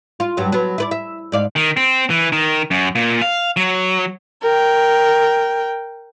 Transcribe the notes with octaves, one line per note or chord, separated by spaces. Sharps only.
F4
G2 F#3
F#3 B3
E4 B4 D5
E5
G#2 D5 F5
D#3
C4
E3
D#3
F#2
A#2
F5
F#3
A#4 G5